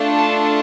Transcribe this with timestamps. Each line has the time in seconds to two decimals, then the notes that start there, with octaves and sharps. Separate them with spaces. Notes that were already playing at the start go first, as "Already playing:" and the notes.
Already playing: A3 D4 F4 A4
0.17 A5